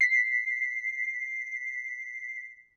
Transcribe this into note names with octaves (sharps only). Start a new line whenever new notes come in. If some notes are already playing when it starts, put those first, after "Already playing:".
B6 C7